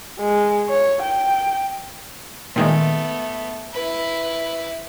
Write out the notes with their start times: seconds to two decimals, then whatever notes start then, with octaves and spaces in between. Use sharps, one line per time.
0.20 G#3
0.69 C#5
1.03 G5
2.56 A#2 D#3 G#3 A3 B3
3.73 E4 B4